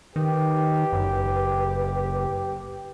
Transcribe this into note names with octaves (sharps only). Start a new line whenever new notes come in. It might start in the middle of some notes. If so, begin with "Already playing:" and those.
D#3 G4 B4
F#1